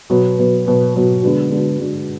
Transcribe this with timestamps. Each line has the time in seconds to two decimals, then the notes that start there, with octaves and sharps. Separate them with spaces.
0.10 B2 F#3 B3
0.37 B2 F#3 B3
0.66 B2 F#3 B3
0.94 B2 F#3 B3
1.22 D3 G#3 B3 D4 F#4
1.50 D3 G#3 B3 D4 F#4
1.78 D3 G#3 B3 D4 F#4